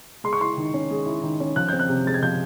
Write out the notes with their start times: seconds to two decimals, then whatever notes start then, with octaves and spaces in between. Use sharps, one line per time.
0.24 G#3 C6
0.33 C#6
0.40 E4 C6
0.57 D#3
0.74 C#4
0.90 G#3
1.06 E4
1.23 D#3
1.40 C#4
1.56 F3 F#6
1.69 C4 G6
1.79 F#6
1.89 C3
2.06 G#3 A6
2.14 G#6
2.23 F3 G6